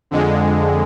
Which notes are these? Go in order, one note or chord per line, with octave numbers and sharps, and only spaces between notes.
F2 D3 G#3